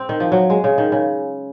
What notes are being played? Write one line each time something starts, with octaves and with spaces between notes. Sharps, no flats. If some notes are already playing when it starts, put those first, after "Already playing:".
Already playing: C4
D#3
F3
F#3
G#3
C#3
D#3
C#3